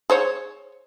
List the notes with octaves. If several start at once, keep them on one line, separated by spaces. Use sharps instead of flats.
G#4 C5 C#5